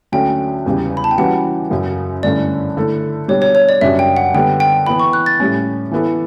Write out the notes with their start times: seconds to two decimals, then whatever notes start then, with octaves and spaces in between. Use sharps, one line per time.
0.12 D2 D3 F#3 C#4 G5
0.66 E2 C#3 G3
0.97 B5
1.04 A5
1.11 G5
1.18 E3 G3 C#4 F#4 B4 F#5
1.71 F#2 C#3 F#3
2.23 G2 D3 A3 C#4 E4 D5
2.77 D3 A3 E4 A4
3.28 B2 G3 D4 C#5
3.42 C#5
3.55 C#5
3.69 D5
3.81 F#2 C#3 G3 D4 F#4 E5
3.99 G5
4.16 F#5
4.34 D3 G3 B3 G5
4.60 G5
4.87 E3 B3 E4 B5
5.00 C#6
5.13 F#6
5.26 A6
5.40 A2 G3 C#4
5.91 E3 B3 E4 A4